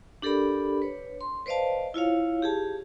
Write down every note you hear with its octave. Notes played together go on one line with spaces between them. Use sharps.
D4 G4 A4 A#4 D5 B5
B4 C#5
C6
B4 C5 D5 D#5 F5 A5
E4 F4 C#5 F5
G4 G#4 A5